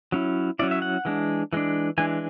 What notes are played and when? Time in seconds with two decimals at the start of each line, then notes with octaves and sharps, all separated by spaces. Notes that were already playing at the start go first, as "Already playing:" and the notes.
0.12 F#3 C#4 E4
0.59 F#3 C#4 E4 D5
0.71 E5
0.82 F#5
1.05 E3 G#3 D4
1.53 E3 G#3 D4
1.98 E3 G#3 D4 G#5